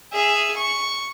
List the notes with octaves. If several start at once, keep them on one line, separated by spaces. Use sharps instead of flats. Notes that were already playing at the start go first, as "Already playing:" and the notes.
G#4 E5
C#6